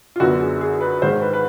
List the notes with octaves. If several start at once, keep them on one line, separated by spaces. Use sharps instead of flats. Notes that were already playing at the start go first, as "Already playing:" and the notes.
F4
F#2 D3 F#3 B3 F#4
G#4
G#4
B4
G#2 D#3 G#3 C5
B4
B4